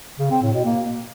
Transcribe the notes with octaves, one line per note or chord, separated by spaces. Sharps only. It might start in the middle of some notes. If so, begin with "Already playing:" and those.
C#3
C4
A2
B2
A#3